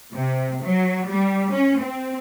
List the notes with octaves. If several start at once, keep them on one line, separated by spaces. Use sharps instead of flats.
C3
F#3
G3
C#4
C4